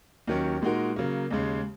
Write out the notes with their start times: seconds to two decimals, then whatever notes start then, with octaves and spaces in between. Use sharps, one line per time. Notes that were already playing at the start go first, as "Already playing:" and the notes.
0.27 D#2 D#3 F#3 C#4
0.62 A#2 G#3 D#4 F#4 A#4
0.96 C#3 F#3 A#3
1.31 D#2 C#3 G#3